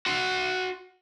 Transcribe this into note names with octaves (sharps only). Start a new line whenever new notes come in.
F#4 C6